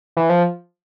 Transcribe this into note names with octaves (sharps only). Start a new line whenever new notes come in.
E3
F3